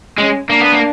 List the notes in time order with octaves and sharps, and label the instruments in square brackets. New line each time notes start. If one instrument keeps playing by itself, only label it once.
[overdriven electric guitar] G#3 [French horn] C#4
[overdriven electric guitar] A#3 [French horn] D4
[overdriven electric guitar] B3
A#3